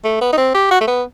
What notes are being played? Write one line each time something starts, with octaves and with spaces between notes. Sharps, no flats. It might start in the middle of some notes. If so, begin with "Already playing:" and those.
A3
B3
D#4
C4
G4
F#4
A3
B3